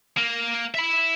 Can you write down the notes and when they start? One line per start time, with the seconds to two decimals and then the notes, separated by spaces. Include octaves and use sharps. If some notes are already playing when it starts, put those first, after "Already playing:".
0.17 A#3
0.75 E5 B5